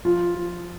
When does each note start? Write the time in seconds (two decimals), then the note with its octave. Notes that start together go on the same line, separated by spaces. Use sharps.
0.05 F3 F4
0.35 F3